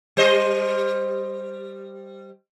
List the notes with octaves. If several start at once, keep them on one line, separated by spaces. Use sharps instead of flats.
G3 C5 D#5